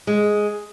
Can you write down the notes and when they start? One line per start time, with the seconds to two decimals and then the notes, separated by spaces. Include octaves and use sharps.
0.07 G#3